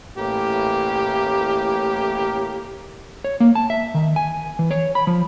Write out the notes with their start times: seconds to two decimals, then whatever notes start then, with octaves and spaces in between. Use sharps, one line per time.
0.16 A1 A2 A#3 G4
3.24 C#5
3.40 A#3
3.55 A5
3.70 E5
3.94 D#3
4.16 G#5
4.59 E3
4.71 C#5
4.95 B5
5.07 F3